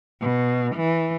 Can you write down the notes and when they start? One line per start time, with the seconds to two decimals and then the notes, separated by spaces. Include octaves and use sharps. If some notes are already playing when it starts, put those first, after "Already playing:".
0.20 B2
0.76 E3